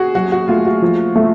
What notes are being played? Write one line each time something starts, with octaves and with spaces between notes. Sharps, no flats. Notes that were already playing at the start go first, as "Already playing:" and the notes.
Already playing: F#4 G#4
F#3 F#4
F#4
A3 F4
F#4
F3
A3